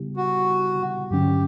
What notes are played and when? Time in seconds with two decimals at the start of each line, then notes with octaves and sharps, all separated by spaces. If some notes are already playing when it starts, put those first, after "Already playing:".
Already playing: C#3 G3 B3 E4 G4
0.17 F#4
1.11 G2 D3 F#3 C#4 G4